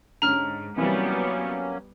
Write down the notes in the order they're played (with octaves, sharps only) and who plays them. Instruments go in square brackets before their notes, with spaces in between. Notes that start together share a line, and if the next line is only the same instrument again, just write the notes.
[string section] G#2 [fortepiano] D3 C#4 [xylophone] A#5 F6
[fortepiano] C3 E3 [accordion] F#3 A#3 C#4 [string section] G3 B3